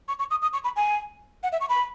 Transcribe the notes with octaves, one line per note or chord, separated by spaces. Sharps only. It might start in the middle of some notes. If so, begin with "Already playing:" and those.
C#6
C#6
D#6
D#6
C#6
B5
G#5
F#5
E5
C#6
B5